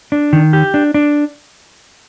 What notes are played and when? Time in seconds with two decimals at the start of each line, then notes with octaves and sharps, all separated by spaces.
0.12 D4
0.33 D#3
0.53 G4
0.74 D4
0.94 D4